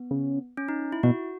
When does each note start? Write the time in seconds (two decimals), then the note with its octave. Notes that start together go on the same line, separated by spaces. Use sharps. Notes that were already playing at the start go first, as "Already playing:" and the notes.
Already playing: B3
0.11 C#3
0.57 C#4
0.69 D#4
0.92 E4
1.03 B2 F#4